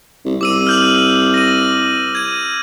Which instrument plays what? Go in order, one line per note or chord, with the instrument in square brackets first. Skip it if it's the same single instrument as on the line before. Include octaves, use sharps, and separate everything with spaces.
[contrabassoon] C2
[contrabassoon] C2 [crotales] D6 E6 D#7
[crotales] F6 G6 F#7
A#6 D#7
G#6 D#7